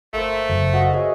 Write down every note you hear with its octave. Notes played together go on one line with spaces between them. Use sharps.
G1 A3 A#3 C5
F#1
F#4 D#5 F5
G#4 C#5 E5